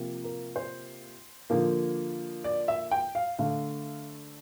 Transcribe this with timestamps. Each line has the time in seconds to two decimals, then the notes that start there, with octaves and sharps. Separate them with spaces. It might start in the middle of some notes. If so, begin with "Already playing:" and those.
Already playing: C3 F3 A#3
0.24 A#4
0.56 C5
1.50 D3 F3 A#3
2.44 D5
2.68 E5
2.91 G5
3.15 F5
3.39 D3 A3 F5